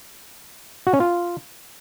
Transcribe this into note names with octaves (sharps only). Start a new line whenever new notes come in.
F#4
C#4
F4